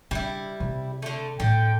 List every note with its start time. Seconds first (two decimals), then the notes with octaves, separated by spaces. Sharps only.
0.11 C#3 G3 D4 E4
0.60 C3
1.02 D3 A3
1.40 A2 D3 G5